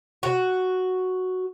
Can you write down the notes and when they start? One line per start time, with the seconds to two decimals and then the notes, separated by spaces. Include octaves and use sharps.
0.23 F#4